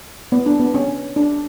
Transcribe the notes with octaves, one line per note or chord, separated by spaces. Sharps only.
B3
D4
B3
C#4
D4